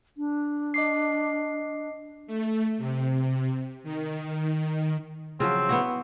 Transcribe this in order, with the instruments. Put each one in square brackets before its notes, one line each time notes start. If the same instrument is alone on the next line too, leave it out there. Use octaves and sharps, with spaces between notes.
[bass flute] D4
[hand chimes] D#5 D6 C7
[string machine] A3
C3
D#3
[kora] C#3 F3 F#3 [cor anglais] C4
[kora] B3 E4 F#4